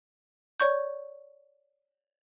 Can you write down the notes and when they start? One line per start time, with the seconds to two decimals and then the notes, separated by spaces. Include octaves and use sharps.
0.60 C#5 D5 C#6 G6